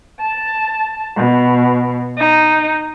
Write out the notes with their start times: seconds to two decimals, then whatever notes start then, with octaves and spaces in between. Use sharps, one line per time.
0.20 A5
1.16 B2
2.16 D#4